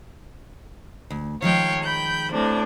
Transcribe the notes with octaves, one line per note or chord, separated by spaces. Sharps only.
D2
D#3 F3 G#3 C#5 F5 G5
G5 B5 G6
A2 C3 D4